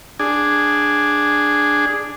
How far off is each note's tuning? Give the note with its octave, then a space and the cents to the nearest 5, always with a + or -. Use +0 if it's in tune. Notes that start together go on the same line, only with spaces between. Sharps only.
D4 +0 G#4 -5